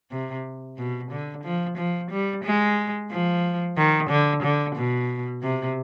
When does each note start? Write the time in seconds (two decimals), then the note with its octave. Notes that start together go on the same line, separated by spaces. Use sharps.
0.11 C3
0.78 B2
1.11 D3
1.44 F3
1.77 F3
2.11 G3
2.44 G#3
3.11 F3
3.77 D#3
4.10 D3
4.43 D3
4.75 B2
5.42 C3